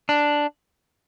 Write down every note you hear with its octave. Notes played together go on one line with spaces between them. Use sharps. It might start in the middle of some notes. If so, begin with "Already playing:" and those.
D4